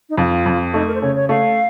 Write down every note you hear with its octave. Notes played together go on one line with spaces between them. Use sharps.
D#4
F2 F4
F2
A3 D#4
A#4
C5
C#3 C#5
C#5
A3 F5